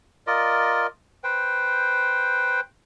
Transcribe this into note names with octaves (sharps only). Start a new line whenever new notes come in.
F4 A#4 D5 D#5
B4 C5 G5